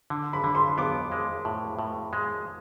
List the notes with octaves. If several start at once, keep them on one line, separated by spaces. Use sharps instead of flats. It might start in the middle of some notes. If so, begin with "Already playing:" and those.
D3
B5
D3
C6
B3 D6
G#3
A2
A2
G#3